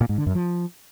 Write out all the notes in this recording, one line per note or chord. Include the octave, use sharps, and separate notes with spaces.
A#2
G#2
D3
F#2
F3